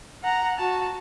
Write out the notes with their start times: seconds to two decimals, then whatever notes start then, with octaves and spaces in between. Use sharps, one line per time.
0.23 F#5 A#5
0.58 F#4 A5